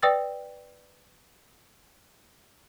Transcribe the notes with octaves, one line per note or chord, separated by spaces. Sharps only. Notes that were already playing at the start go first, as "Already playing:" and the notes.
B4 D5 G5 D#6 E6 A6